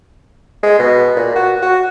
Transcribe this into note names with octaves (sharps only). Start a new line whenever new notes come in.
G#3
B2
A#2
F#4
F#4